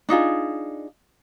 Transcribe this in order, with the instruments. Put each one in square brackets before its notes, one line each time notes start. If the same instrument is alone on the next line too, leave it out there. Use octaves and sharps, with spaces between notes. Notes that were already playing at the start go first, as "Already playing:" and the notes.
[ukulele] D4 D#4 F4 G#4